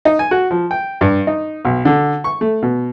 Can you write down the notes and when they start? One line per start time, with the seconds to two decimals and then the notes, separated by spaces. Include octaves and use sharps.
0.05 D#4
0.19 G#5
0.31 F#4
0.51 F3
0.71 G5
1.01 G2
1.27 D#4
1.65 B1
1.85 D3
2.24 C#6
2.41 A3
2.62 B2